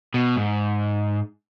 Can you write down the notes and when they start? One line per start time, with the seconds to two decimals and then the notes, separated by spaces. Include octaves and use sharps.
0.14 B2
0.36 G#2